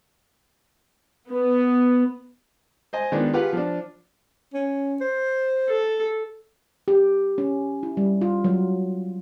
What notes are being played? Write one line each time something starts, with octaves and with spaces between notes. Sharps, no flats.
B3
C5 D#5 G#5
D#3 G#3 B3 D4 F4
F4 G4 G#4 B4 F5 F#5
F3 D4
C#4
C5
A4
G4
C#4
E4
G3
F4
F#3